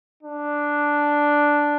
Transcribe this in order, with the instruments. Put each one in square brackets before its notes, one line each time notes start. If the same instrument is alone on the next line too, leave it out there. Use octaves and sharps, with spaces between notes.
[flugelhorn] D4